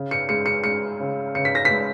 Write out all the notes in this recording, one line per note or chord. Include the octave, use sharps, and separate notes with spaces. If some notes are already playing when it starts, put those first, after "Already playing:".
Already playing: C#3
C#7
G#3 C#7
C#7
G#3 C#7
C#3
C#3 C#7
B6
A#6
B6
G#3